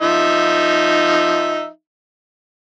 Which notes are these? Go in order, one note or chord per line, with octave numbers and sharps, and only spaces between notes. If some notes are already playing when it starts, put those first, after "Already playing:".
F3 D#4 E5